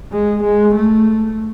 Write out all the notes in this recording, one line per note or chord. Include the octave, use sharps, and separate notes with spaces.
G#3
G#3
A3